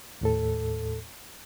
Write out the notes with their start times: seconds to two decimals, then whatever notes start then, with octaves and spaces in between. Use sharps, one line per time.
0.21 D#2 A2 A4